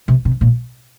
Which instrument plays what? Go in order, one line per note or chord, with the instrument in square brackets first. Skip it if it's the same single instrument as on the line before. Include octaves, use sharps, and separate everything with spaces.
[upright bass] C3
C3
A#2